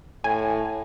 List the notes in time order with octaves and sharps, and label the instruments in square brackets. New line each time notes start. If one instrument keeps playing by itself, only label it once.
[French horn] A2 [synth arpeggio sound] G#5